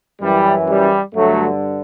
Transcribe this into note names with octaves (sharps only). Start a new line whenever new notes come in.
F#2 E3 G3
G3
G2 D3 F#3 A3